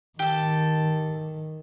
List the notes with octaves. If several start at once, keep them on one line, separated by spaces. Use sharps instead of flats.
D#3 G4 A4